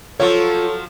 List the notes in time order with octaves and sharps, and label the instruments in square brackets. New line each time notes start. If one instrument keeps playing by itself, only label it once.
[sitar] F3 F#3 [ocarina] F4 [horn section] A4 [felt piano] C#5